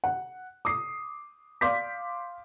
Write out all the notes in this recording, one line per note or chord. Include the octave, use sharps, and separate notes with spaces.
F#5
D6 D#6 C7
D5 F5 C6 D6 G6 B6